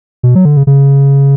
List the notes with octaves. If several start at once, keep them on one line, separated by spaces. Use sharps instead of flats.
B2
F#3
D3
C#3
C#3